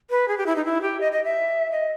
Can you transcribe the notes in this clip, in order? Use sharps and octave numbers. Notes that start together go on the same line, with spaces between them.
B4
G#4
G4
E4
D#4
E4
G4
D#5
D#5
E5
D#5